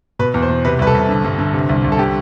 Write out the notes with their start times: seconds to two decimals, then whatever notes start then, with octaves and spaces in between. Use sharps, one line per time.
0.19 B2 B4
0.34 E2
0.42 C5
0.49 B2
0.65 C3 B4
0.79 C2 B4
0.87 A4
0.95 C2
1.09 D3
1.25 G2
1.39 D3
1.53 C3
1.69 C2
1.84 C2
1.92 A4
1.99 D3 G4